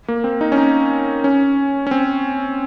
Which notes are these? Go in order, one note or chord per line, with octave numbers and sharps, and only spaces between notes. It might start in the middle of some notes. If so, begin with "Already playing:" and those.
A#3
C4
D#4
C#4
D#4
C#4
C#4
C4